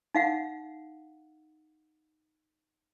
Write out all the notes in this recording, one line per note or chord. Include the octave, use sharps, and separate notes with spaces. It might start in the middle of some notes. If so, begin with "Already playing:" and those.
D#4 F5 F#5